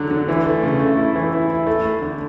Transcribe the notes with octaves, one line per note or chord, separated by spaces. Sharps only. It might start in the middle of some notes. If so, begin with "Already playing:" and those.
Already playing: D3 F#3
D3
E3
A3
C#3
A3
E4
E3
E4
E4
A3
A3
D3